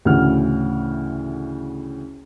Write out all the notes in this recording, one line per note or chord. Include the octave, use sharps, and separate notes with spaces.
D2 A2 C#3 E3 F#5 F6